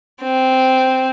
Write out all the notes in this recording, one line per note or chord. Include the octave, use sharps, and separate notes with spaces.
C4